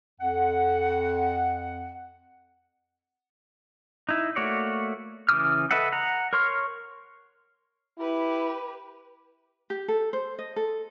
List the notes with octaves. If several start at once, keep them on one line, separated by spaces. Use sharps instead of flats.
F2 F#5
D#4 E4
A3 A#3 F#4 C#5 D5
C#3 E3 D6 D#6 F6
A4 B4 D#5 E5 F#5
F#5 A#5
A#4 C#5 C6 C#6 F6
E4 G4 B4
G4
A4
C5
D#5
A4